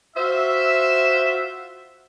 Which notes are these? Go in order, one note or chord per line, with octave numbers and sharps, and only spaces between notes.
F4 F#4 C5 E5